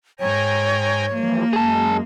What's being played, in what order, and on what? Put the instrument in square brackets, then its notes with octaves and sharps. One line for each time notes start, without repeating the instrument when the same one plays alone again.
[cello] G#2 [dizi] C#5 [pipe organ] G5 G#5 A#5
[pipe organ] E3 F3 G3 [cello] A#3
[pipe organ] F#2 G#3 [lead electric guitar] G#4 A5